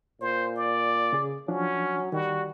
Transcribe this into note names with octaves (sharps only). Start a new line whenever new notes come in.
A#2 C5
D5
C#3 G#4
F3 F#3 C#4 D4
D#3 G3 F#4